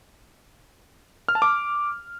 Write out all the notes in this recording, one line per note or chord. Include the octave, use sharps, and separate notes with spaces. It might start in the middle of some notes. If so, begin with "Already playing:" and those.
F6
A5
D6